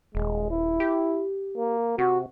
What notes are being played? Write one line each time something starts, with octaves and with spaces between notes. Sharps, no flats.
D#1 G#3
E4
G4
A#3
C3 F#4